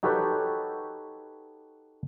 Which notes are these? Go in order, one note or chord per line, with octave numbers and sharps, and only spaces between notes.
D#4 F#4 G4 A4 B4 C#5